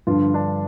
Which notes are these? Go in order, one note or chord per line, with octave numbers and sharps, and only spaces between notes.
G2 D3 F3 F4
D4